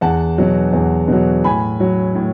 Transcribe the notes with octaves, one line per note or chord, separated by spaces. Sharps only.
E2 F#5 A5
B2 F#3
E2
B2 F#3
A2 G#5 B5
F#3
A2